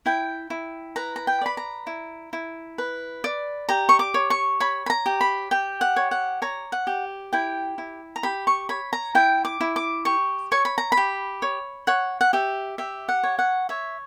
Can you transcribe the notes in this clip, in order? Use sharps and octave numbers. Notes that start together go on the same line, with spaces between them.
E4 G5
E4
B4 A#5
A#5
G5
D5 B5
A#5
E4
E4
B4
D5
G4 A#5
C#6
D6
C#5
C#6
C#5 B5
B5
A#5
G4
B5
G4 G5
F#5
C#5
F#5
C#5 A#5
F#5
G4
E4 G5
E4
A#5
G4 B5
C#6
C#5 B5
A#5
E4 G5
D6
E4
D6
G4 C#6
C#5 C#6
B5
A#5
B5
G4
C#5
C#5 F#5
F#5
G4 E5
G4 E5
F#5
C#5
F#5
C#5 E5